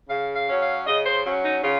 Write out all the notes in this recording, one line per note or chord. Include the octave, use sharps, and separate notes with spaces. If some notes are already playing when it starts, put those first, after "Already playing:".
C#3 F5
F5
F#3 C#4
F5
C#3 D#5
C5
F#3 C#4
D#4
C#3 F4